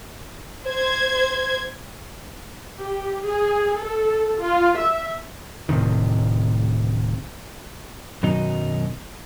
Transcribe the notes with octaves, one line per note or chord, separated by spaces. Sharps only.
C5 G#6
G4
G#4
A4
F4
E5
D1 A2 C3 D#3
F#2 B2 D#3 F#3 D#4